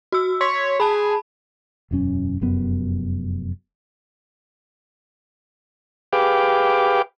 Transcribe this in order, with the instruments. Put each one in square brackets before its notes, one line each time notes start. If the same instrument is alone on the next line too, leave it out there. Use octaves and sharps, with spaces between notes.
[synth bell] F#4 E6
[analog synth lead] C#5 [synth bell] C6 B6
[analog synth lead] G#4 [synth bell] A5 B5
[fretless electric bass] E1 F#2 C#4
F1 F#2 B3
[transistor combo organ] G4 G#4 B4 F5 G5 D6